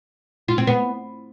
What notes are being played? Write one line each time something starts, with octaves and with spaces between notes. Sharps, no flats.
F4
C4
B3